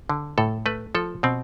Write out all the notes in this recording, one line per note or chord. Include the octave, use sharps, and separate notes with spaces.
D3
A2 A4
A3 B4
F3 A4
B2 C4